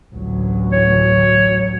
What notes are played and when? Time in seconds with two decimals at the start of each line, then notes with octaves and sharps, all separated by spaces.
0.11 A1 D2 F#3
0.72 C#5